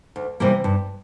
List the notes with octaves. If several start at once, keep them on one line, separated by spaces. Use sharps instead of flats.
D2
C3 E3 G3 A#3
G2